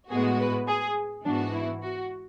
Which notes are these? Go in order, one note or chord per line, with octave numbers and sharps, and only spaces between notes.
A2 G#3 B3 F#4 G#4
B4
G#4
G#2 E3 B3 D4 F#4
E4
F#4